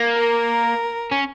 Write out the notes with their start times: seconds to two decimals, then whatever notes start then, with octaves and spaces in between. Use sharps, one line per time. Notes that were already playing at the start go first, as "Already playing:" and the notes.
Already playing: A#3
0.16 A#4
1.11 C#4